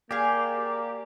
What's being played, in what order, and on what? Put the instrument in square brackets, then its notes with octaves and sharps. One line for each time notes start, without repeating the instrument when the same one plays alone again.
[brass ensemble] A#3 D5 [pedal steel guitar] G4 [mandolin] G#4 F5